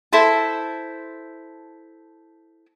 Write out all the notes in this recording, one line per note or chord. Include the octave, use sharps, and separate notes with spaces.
E4 A4 C5 A5